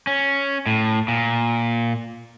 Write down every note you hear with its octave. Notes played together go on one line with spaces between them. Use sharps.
C#4
A2
A#2